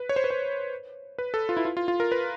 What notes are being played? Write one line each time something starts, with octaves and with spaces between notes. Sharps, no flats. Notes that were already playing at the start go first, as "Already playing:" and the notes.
Already playing: B4
C#5
C5
B4
C5
B4
A4
F4
E4
F4
F4
F4
A#4
B4